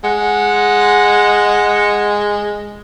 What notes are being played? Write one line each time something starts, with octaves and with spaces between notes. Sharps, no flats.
G#3 F#5